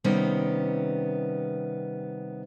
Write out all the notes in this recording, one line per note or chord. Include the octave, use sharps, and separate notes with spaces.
C3 D#3 G3 B3 C#4